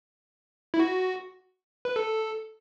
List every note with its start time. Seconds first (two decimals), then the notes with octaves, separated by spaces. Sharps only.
0.74 E4
0.79 F#4
1.85 B4
1.96 A4